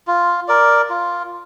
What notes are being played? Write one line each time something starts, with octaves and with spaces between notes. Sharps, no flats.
F4
A#4 D5
F4